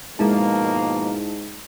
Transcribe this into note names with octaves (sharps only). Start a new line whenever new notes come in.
G#2 B2 F3 G#3 A#3 E4 A5